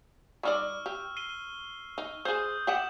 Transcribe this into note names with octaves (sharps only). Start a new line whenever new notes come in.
G3 D#4 D5 C#6 E6 F6
G4
C7 D#7 G7
D#4
G#4 C5 D#6 G6
G4 F#5 E7 F#7